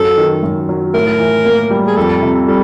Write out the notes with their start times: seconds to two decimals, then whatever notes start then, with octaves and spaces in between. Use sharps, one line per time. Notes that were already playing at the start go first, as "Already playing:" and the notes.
Already playing: F#2 F#3 A4
0.17 D#3
0.43 F#2
0.69 F#3
0.94 A2 A#4
1.19 E3
1.45 A#3
1.70 G3
1.87 G#4
1.97 F2 A4
2.22 C3
2.48 G3 A4